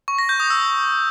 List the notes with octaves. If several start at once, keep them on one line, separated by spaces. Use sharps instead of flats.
C#6
A#6
G6
D#6
E6